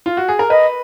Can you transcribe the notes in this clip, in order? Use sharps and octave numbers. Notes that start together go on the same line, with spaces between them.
F4
F#4
G#4
A#4
B4 D#5